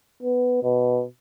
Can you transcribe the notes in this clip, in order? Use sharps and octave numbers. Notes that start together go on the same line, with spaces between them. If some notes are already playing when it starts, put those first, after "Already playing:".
B3
B2